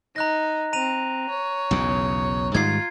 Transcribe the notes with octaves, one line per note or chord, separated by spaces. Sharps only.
D#4 A#5 F#6 A#6
C4 A#5 D#7 F7
C#5
B1 E2 C#3
G#2 D#3 G3 F4 G#6 C7